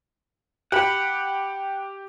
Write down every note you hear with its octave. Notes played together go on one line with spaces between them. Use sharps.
G4 F#5 B5